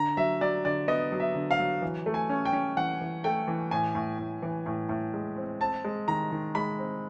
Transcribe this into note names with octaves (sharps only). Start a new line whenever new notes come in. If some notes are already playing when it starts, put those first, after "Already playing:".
Already playing: D3 A#5
F#3 E5
F#3 D5
D3 D5
B3 D#5
F#3
E5
D3
F5
F#3
E3
A3
G#5
C#4
G5
C#4
E3 F#5
E3
A3 G5
E3
A2 G#5
A2
A2
E3
A2
A2
G#3
C4
C4 A5
G#3
D#3 A#5
D#3
G#3 B5
C4